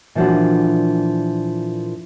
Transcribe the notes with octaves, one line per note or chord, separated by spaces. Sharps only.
A#2 E3 F3 D4 F#4